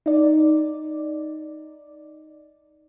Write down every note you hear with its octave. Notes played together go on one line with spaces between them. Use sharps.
D#4 D5